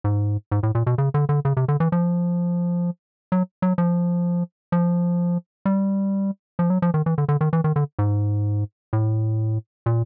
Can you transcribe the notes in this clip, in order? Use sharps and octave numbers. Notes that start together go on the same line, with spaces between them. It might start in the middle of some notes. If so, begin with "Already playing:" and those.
G#2
G#2
A2
A#2
B2
C#3
D3
D3
C#3
C3
D3
E3
F3
F#3
F#3
F3
F3
G3
F3
F#3
F3
D#3
E3
D3
D3
D#3
E3
D#3
D3
G#2
A2
A#2